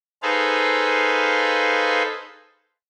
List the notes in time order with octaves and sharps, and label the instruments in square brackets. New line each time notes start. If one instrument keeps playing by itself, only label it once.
[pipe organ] D#4 G#4 A4 B4 C5 F5